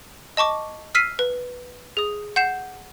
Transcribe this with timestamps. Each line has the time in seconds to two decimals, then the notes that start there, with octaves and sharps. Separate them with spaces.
0.37 D#5 A5 C#6 D6
0.95 E6 F6 B6 C7 D#7
1.19 B4
1.97 G#4 D#6
2.36 F#5 G6 C7 E7